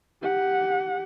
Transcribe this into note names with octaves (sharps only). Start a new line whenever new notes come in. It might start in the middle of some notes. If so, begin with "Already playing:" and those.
G4 F#5